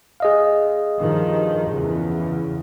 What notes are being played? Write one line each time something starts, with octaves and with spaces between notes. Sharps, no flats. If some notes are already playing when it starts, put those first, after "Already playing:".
G#4 D#5 F5
G2 D#3 F3
E2 C#3